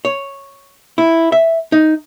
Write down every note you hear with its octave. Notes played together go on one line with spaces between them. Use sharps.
C#5
E4
E5
D#4